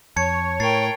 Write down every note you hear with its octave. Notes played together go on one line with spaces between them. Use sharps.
F2 C#5 A5 G#6 C#7
A2 A#4 G5 A6 C7